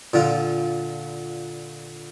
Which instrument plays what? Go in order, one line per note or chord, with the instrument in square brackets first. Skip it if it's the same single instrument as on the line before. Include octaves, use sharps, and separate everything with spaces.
[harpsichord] A#2 D3 F4